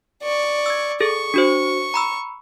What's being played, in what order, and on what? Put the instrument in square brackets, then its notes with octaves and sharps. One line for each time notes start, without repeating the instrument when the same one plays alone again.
[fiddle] D5 C#6
[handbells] E6 G#6
[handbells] G#4 A4 [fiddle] C#6
[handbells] D4 F#4 C5
A#5 B5 E6